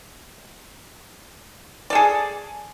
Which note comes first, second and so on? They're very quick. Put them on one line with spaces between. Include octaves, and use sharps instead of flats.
D5 A4 G#4